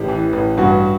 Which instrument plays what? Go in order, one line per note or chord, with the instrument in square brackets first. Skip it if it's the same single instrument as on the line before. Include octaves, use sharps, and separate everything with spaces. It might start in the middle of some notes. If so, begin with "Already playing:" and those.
Already playing: [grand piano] A1 G4
E3
A1
G2 F#4